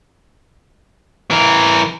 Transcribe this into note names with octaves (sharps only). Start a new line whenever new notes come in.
E3 A#4